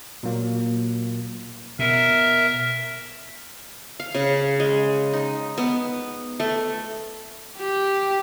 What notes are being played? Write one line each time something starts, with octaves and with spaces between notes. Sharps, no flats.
A#2 F#3 A#3
B2 A#4 E5
F5
C#3
G#3
D#4
B3
A3
G4